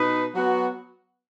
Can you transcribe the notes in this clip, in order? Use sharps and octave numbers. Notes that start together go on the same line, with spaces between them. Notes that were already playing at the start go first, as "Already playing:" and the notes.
Already playing: B2 D#4 B4
F#3 B3 F#4